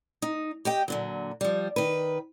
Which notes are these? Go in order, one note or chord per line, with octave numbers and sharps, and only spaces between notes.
D#4
G4 D#5 G5
A#2 D3 F#3
F3 G3
D#3 B4